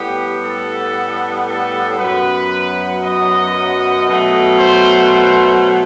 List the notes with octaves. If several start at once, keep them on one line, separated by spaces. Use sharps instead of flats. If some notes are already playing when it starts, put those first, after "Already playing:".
Already playing: A2 G3 B3 G4
A4
A4
F#2 F#3 B3 B4
D#5
B2 F#3 A3
C5
C5